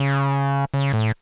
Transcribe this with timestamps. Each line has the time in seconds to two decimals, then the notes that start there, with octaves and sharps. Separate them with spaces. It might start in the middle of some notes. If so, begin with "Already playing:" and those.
Already playing: C#3
0.74 C#3
0.93 A2